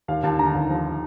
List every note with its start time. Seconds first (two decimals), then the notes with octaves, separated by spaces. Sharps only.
0.08 D#2 F5
0.23 D#2 A5
0.39 D3 A#5
0.55 D#2
0.70 F3